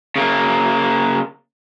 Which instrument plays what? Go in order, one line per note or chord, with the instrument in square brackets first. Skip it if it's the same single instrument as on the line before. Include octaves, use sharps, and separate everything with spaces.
[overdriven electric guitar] C#3 A#3